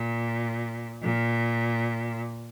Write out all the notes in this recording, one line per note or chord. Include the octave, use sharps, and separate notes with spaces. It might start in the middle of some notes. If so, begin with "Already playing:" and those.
Already playing: A#2
A#2